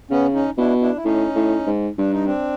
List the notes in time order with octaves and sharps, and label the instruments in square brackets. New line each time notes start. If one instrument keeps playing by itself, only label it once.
[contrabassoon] C#3 [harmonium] B3 C#4
[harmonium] C#4 D#4
[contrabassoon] B2 [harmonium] D4 E4
[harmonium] D4 E4
E4
[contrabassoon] A2 [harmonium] C#4 D#4
[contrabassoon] A2
G#2
[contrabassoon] G2 [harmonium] D4
[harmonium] D#4
C4 D4